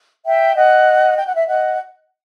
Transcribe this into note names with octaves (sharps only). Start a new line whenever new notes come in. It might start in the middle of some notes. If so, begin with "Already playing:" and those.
E5 G5
D#5 F#5
G5
F#5
E5
D#5 F#5